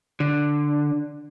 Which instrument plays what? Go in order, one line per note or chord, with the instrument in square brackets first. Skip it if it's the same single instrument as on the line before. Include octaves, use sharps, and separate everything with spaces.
[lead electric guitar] D3